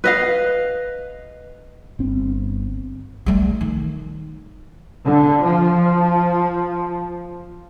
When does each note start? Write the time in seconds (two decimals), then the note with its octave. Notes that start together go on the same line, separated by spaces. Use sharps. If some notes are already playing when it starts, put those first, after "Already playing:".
0.04 B4 D#5 F5
1.99 G1 C4
3.26 G3 A3
3.61 D#3
5.05 D3
5.43 F3